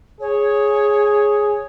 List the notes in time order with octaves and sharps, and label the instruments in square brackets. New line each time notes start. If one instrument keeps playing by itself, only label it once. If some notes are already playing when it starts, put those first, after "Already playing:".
[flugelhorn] G#4 [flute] C#5